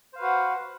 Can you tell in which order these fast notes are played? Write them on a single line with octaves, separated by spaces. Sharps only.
C5 F5 B4 F#4 F#5